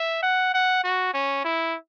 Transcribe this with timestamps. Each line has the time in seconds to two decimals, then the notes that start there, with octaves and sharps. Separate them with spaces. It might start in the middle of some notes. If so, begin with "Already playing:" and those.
Already playing: E5
0.23 F#5
0.54 F#5
0.84 F#4
1.14 C#4
1.44 E4